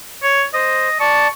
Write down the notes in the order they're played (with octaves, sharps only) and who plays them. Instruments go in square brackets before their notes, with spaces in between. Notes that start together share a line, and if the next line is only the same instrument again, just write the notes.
[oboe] C#5
[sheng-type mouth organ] C5 [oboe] D#5
[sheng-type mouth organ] D5 A5 [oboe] C#6